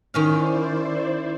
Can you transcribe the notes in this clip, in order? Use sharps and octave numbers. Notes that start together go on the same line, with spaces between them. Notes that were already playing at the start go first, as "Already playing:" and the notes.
D#3 C#4 E4 C5 D5 F5